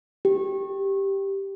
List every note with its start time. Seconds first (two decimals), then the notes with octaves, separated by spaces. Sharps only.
0.25 G4